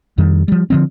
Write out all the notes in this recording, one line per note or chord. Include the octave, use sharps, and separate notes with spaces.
F2 D#3 G3
F3 G3
D3 F3 C4